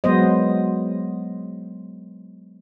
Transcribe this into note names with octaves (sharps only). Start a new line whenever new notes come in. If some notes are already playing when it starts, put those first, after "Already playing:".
F#3 G#3 B3 C5 D#5